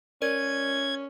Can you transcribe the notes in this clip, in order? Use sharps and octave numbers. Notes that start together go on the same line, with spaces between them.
C#4 A#4 D5 G#6 D#7